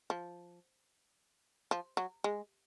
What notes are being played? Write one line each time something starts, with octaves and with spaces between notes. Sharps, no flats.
F3
F3
F#3
G#3